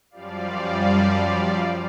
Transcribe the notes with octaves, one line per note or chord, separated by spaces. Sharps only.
F#2 F3 G3 D5 F5